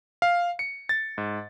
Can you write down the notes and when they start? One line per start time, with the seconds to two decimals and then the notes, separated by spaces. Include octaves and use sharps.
0.22 F5
0.59 C#7
0.89 A6
1.18 G#2